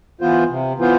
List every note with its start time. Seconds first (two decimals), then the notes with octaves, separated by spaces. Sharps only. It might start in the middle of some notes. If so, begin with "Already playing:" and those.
0.21 E3 B3 F4 C5
0.50 C3
0.78 E3 B3 F4 C5